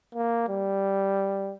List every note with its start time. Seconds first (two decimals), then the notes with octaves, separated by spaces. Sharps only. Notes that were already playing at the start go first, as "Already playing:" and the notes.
0.14 A#3
0.49 G3